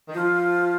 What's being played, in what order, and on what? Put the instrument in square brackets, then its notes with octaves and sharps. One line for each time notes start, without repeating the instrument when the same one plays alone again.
[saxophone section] D#3
[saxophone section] F3 [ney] F4